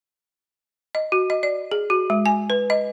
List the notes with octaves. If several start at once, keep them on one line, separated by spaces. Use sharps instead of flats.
D#5
F#4
D#5
D5
G#4
F#4
G#3
G#5
B4
D#5